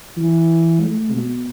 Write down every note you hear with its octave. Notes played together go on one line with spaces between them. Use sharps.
E3
A3
B2